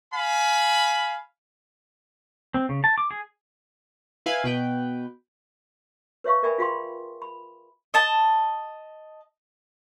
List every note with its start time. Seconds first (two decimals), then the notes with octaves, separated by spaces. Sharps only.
0.14 F5 G#5 B5
2.54 C4
2.69 C#3
2.84 A5
2.98 D6
3.11 G#4
4.26 E4 B4 F5 G#5
4.44 B2 B4 G5
6.24 B4 C#5 E5 F5 C#6
6.43 A#4 D5 E5 G5 G#5 B5
6.58 F4 G#4 F5 G5 B5 C6
7.22 B5
7.94 D#5 A5